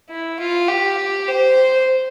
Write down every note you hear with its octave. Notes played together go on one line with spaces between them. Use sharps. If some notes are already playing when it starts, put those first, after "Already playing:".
E4
F4
G4
C5